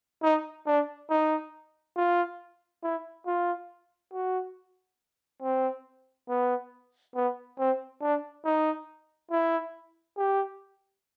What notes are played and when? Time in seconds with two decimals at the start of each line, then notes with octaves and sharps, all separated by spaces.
0.23 D#4
0.66 D4
1.10 D#4
1.96 F4
2.83 E4
3.26 F4
4.13 F#4
5.42 C4
6.29 B3
7.15 B3
7.58 C4
8.02 D4
8.45 D#4
9.31 E4
10.17 G4